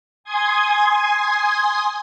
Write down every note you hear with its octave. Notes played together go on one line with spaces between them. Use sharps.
G#5 C6 D#6 G#6